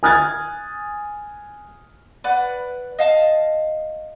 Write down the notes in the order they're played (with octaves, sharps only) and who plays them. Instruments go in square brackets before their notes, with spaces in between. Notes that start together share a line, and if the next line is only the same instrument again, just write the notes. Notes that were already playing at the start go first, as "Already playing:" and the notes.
[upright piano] G#5 D#6 F6 F#6 G#6 A6
[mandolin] B4 D5 F#5
D#5 F5 A5